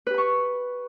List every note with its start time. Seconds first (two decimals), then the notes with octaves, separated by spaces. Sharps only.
0.07 B4
0.10 G4
0.14 B5
0.18 C#6